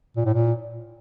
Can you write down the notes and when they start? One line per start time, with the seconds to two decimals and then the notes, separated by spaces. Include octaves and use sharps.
0.16 A#2
0.25 A2
0.34 A#2